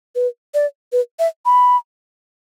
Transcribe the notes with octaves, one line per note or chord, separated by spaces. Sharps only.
B4
D5
B4
E5
B5